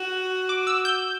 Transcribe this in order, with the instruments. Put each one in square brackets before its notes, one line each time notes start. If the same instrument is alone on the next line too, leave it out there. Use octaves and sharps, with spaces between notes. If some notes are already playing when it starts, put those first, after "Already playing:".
Already playing: [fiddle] F#4
[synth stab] D6
E6
G6